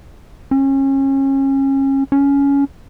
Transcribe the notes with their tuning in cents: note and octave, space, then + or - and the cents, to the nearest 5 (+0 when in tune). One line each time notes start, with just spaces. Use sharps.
C#4 -30
C#4 +15